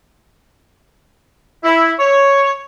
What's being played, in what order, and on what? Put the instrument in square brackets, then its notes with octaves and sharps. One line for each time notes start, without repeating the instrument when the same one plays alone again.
[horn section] E4
C#5